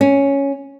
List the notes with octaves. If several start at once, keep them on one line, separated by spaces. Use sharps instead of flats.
C#4